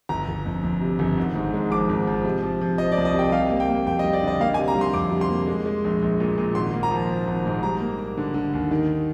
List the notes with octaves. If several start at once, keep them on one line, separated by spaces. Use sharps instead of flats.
G1 A#5
G1
F2
F2
C3
G1
G#1
G#2
G#3
F3 D6
G#1
F3
C3
F3
F3
F3 D#5
D5
C2
D#5
C3 G5
G3 F5
A#3
G5
A#3
F2 G5
D#5
G3
D5
D3 D#5
A#3 F5
G#5
C3
A#5
G3
C6
F2 D6
C3
C6
A#3
G#3
G#3
A#1
A#1
A#2
A#2
G#1 C6
A#3
A#5
F3
F3
G#1
G#2
G3 A#5
A#3
A#3
D3
D3
D#2
D#3